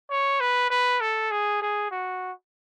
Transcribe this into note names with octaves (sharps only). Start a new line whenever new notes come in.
C#5
B4
B4
A4
G#4
G#4
F#4